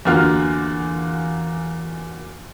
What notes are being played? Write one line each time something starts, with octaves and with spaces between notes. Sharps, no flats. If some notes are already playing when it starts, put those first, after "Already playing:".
E2 D3 A#3 F4 F#4 F6